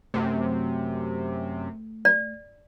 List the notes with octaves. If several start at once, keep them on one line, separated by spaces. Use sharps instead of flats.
F#2 C3 A3
D5